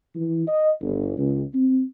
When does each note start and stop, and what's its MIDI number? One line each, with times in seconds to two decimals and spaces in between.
0.15 0.43 52
0.47 0.70 75
0.81 1.13 31
1.18 1.43 37
1.54 1.82 60